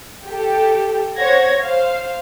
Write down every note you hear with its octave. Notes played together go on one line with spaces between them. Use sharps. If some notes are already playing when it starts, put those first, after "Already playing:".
G4 A4 G5
C5 C#5 F#5 G#6 A#6
C5 F5